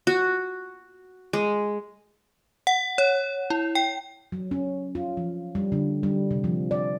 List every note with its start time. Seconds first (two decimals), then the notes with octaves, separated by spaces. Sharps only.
0.07 F#4
1.33 G#3
2.67 F#5
2.98 C#5
3.50 E4
3.75 G5
4.32 F#3
4.51 C#4
4.95 F4
5.17 F3
5.55 G3
5.72 D3
6.03 G3
6.31 C3
6.44 F3
6.71 D5